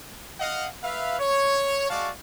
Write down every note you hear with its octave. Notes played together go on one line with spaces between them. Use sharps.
D#5 F5 F#5
B4 E5 F5
C#5
G#3 F#4 D5 F5 A5 C#6